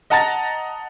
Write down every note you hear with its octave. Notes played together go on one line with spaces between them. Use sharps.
D#5 F#5 A5 A#5 A6 A#6